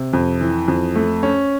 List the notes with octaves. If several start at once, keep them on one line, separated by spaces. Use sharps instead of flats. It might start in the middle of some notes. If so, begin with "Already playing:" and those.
Already playing: C3
F2
E3
F2
A3
C#4